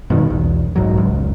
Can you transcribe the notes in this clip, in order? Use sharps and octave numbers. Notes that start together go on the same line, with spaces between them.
G2 B2 D#3
B1 E2
B1 G#2 F#3
F1 C#2